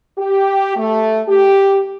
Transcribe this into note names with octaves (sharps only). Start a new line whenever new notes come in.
G4
A3
G4